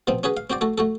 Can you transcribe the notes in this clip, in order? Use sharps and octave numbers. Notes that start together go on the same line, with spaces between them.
B2 F3 B3 C4
C#4 F#4 G#4 B4
F5
C4 F#4 C5 D5
A3 F#4 A4
A3 F#4 A4